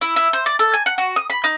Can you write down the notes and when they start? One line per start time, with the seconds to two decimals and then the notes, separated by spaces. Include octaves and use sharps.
0.01 E4
0.16 E4
0.33 C5
0.46 D5
0.59 A4
0.74 G#5
0.86 F#5
0.98 F#4
1.16 D#6
1.30 B5
1.44 D#4